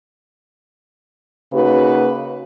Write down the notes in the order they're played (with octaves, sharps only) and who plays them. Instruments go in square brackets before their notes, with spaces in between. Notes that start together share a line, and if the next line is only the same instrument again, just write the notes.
[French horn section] C#3 A#3 D#4 F#4 B4